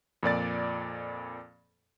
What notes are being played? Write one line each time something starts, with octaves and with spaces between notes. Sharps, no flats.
F2 A#2 D5 A6